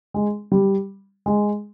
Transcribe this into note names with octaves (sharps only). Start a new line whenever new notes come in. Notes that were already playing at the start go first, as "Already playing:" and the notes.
G#3
G3
G#3